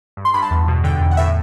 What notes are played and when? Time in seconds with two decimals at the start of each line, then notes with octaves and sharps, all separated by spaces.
0.17 G2
0.25 C6
0.34 G2 B5
0.42 A5
0.51 E2
0.68 B2
0.84 D3 G5
1.00 E2
1.11 F#5
1.17 A2 E5